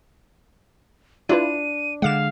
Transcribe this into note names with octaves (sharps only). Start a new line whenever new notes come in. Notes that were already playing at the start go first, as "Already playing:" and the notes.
D4 E4 F4 B4 D#7
D3 G#3 F5 F#5 D6 E7